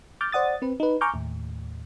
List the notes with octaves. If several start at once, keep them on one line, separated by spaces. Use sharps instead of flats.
D6 F6 G6 A6
C5 D5 F#5 D#6 A6
C4 B4
D#4 B4
G#5 A#5 C#6 D6 F6 G6
D#2 A2